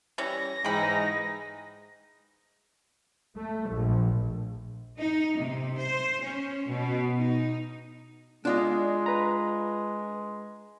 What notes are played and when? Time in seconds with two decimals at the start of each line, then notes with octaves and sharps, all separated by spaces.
0.18 E3 G3 C#4 A#6
0.65 G#2 E3 G#3 D#4 G5 B5
3.37 A3
3.70 A#1
4.98 D#4
5.39 C3
5.79 C5
6.22 C#4
6.70 B2
7.17 D#4
8.45 G#3 D4 F4 D#5
9.06 B4 A#5